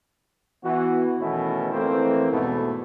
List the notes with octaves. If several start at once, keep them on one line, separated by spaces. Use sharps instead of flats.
E3 B3 F#4
B2 D#3 E3 A3 C#4 E4
F2 E3 A3 A#3 C4
E2 G#2 B2 A3 B3